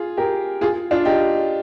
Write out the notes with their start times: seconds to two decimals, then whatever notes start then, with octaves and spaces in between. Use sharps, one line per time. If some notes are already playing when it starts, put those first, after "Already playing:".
Already playing: F4 G#4
0.17 G4 A#4
0.61 F4 G#4
0.91 D4 F4
1.05 D#4 G4